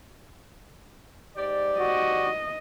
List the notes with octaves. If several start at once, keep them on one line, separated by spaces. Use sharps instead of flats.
G#2 G4 D5
F#4 D#5